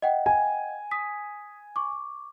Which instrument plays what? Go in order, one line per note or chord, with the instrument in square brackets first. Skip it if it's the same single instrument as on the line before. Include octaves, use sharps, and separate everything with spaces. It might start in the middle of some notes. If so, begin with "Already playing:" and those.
[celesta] D#5 F#5 G5
[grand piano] G#5
[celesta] D#6 B6
C#6 D6